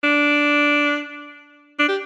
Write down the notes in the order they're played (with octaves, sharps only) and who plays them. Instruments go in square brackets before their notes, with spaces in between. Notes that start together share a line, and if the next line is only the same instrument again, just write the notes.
[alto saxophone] D4
D4
G4